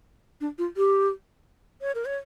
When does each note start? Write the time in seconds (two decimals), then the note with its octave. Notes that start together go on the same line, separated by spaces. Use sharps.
0.41 D4
0.58 F4
0.77 G4
1.81 C#5
1.95 A#4
2.05 C#5